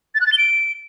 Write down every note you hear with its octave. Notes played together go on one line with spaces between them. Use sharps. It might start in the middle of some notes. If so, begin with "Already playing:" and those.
A6
F#6
A6
G7
D7